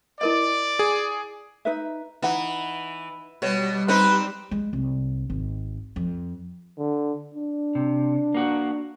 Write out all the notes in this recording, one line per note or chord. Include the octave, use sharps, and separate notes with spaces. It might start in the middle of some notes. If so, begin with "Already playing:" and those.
E4 A#4 D5 D#5
G#4
D#4 B4 E5
E3 D#4 F#5
B2 G3 C#5
C4 D#4 B4 C5 B5
G#3
C2
G#1
F2
D3
D4
C3
A#3 F#4